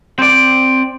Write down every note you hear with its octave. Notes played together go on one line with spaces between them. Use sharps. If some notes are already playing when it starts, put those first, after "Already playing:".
C4 D5